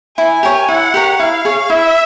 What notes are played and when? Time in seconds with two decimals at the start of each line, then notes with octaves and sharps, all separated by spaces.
0.18 E4 G#5
0.43 G4 A#4 C#5
0.68 E4 F#5
0.94 G4 A#4 C#5
1.19 E4 F5
1.45 G#4 C#5
1.70 E4 E5